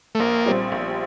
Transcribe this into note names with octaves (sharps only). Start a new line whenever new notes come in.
A3
A#1 A#3
A#2 G3 C4
A#1